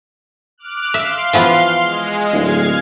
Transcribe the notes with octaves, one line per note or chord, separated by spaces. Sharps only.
D6 F6 F#6
E5 F5 C6
E3 F3 B3
G#3
D1 F5 G#6